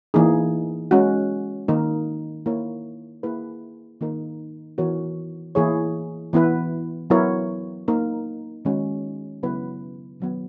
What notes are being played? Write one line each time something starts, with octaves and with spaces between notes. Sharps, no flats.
E3 A#3 D#4 G#4
G#3 C#4 F#4
D#3 A#3 D#4 A#4
A#3 E4 A#4 C#5
A#3 E4 G#4 B4
D#3 A#3 D#4 A#4
E3 B3 F#4 A#4 C#5
E3 A#3 E4 G#4 C#5
E3 B3 E4 B4
F#3 B3 E4 A#4 C#5
A#3 D#4 A#4
D#3 G#3 C#4 F#4
C#3 F#3 B3 E4 B4
D#3 F#3 B3